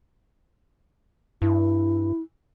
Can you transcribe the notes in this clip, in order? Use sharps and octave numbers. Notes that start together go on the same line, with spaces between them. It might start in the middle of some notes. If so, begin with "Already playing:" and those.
G2 E4